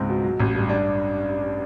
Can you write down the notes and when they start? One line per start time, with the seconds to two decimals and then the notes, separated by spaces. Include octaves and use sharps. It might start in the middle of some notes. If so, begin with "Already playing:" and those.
Already playing: C#2 G#2 C4
0.09 B2
0.24 F#3
0.40 A1
0.55 G2
0.69 D4